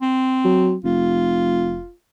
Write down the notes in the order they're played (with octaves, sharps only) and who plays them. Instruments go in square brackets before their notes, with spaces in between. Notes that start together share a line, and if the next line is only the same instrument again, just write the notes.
[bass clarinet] C4
[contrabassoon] F#3
[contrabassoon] F1 [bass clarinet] F4